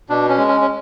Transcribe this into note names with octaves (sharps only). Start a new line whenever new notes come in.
B2 D4
C#4
G#3
C#4
C#4